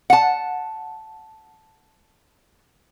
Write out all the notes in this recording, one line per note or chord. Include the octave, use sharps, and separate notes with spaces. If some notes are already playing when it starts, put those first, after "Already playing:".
F#5 A5